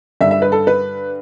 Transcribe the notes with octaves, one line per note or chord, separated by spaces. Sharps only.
G2 D3 G3 E5
E5
B4
A4
B4